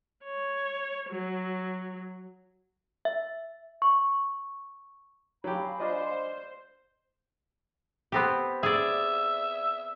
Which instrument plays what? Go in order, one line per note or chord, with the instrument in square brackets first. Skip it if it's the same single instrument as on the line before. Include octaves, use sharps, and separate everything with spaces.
[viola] C#5
F#3
[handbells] E5
C#6
[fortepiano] F#3 G4 [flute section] F5 G#5 B5
[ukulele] D4 F4 D#5 [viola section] C5
[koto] B3 C4 G4
[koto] G#4 D5 [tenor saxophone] E5